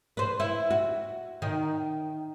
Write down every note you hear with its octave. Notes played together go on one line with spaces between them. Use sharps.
B4 C5
E4
F#4
D#3